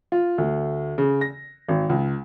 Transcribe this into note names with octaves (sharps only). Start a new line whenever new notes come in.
F4
D2
C#3
A#6
G#1
C#2